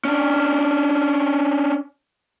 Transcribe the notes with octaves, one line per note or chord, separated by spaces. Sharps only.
C#4 D4